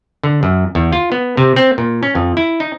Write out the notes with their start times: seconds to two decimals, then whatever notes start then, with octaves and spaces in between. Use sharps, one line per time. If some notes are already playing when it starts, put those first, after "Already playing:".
0.24 D3
0.43 F#2
0.75 E2
0.93 F4
1.12 B3
1.37 C3
1.56 C4
1.78 A#2
2.03 C#4
2.15 F2
2.37 E4
2.60 D#4